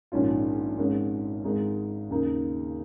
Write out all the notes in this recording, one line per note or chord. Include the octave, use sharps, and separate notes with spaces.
A#1 G#2 D#3 C#4 F4
G#1 G#2 G#3 C#4
G#1 G#2 G#3 D#4
D#2 C#3 A#3 D#4